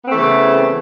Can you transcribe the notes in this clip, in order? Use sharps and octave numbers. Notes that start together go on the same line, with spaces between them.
C#3 E3 A3 B3 C4